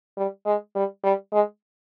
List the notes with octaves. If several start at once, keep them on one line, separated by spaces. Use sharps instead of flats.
G3
G#3
G3
G3
G#3